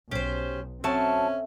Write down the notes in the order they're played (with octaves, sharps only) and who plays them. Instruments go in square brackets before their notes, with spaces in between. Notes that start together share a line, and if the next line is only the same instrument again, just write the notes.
[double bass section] B1 [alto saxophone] C#4 [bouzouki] G4 C5
[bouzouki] F#3 A5 [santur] A3 [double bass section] C4 [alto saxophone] C#4